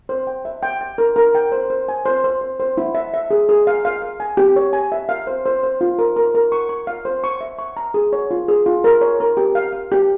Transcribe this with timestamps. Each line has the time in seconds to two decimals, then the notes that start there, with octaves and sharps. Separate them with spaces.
0.09 C5
0.27 G5
0.45 E5
0.63 G5
0.81 G5
0.98 A#4
1.16 A#4
1.35 G5
1.52 C5
1.70 C5
1.89 G#5
2.06 C5
2.24 C5
2.41 C5
2.60 C5
2.78 E4
2.95 E5
3.14 E5
3.31 G#4
3.49 G#4
3.67 F5
3.85 F5
4.02 F5
4.20 G#5
4.37 G4
4.56 C#5
4.73 G#5
4.92 E5
5.09 F5
5.27 C5
5.46 C5
5.63 C5
5.81 F4
5.99 A#4
6.16 A#4
6.35 A#4
6.52 C#6
6.69 C#6
6.87 F5
7.05 C5
7.24 C#6
7.41 E5
7.59 C#6
7.77 A#5
7.94 G#4
8.13 C#5
8.31 F4
8.48 G#4
8.66 F4
8.84 A#4
9.01 C#5
9.20 A#4
9.37 G4
9.55 F5
9.73 F5
9.92 G4